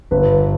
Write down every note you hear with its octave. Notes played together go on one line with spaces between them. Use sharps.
G1 B4